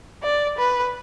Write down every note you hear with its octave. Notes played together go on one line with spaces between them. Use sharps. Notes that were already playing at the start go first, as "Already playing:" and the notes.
D5
B4